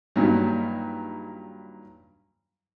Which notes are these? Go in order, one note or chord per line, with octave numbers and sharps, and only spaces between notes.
G2 A#2 D#3 F#3